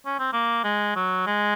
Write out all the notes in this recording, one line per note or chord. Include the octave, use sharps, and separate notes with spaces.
C#4
C4
A#3
G#3
F#3
G#3